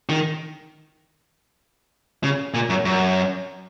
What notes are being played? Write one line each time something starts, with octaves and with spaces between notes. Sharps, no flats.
D#3
C#3
A#2
F#2
F#2